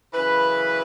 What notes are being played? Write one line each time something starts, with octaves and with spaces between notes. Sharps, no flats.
F#2 C#3 E3 B4